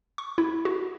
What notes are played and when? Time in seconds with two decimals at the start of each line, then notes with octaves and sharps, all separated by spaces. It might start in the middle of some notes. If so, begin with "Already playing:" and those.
0.18 C#6
0.38 E4
0.65 F#4